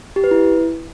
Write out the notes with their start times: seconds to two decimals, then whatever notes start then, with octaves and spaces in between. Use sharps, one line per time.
0.16 G4
0.24 B4
0.31 E4